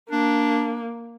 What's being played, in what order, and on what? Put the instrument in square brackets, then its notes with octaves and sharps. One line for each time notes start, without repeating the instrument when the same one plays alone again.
[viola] A#3 [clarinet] D4